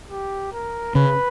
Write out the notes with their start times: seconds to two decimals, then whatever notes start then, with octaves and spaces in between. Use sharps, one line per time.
0.11 G4
0.53 A#4
0.95 C#3 B4